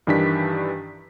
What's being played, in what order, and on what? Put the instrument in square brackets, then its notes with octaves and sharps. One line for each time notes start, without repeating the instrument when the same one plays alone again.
[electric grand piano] G2 D#3 E3 D4 G4 B6